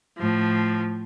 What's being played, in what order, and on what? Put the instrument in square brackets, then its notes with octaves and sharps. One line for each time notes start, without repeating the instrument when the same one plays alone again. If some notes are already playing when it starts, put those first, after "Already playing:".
[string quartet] A2 F3